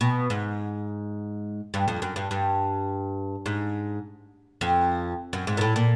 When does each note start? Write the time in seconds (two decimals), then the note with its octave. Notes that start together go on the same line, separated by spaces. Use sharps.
0.01 B2
0.30 G#2
1.74 G2
1.88 F2
2.02 F#2
2.16 G2
2.31 G2
3.46 G#2
4.61 F2
5.33 F#2
5.47 G#2
5.57 A#2
5.61 A2
5.76 A#2